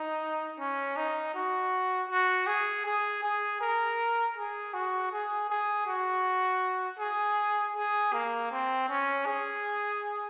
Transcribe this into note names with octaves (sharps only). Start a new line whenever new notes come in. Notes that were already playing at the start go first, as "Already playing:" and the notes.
Already playing: D#4
C#4
D#4
F#4
F#4
G#4
G#4
G#4
A#4
G#4
F#4
G#4
G#4
F#4
G#4
G#4
A#3
C4
C#4
G#4